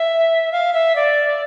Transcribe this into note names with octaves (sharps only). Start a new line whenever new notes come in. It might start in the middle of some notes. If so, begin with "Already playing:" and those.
Already playing: E5
F5
E5
D5